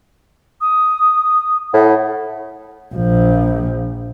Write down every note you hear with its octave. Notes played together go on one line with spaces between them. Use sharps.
D#6
A2 F#5
A#1 F3